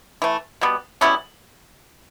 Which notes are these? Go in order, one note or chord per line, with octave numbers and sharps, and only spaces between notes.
E3 A3
B2 G3 B3
B2 G3 B3 C#4 E4